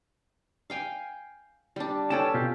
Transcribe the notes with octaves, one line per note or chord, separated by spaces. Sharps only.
F5 G5 G#5
G3 D4
C#4 A4 B4 C#5 G5 A5
B2 F4 G4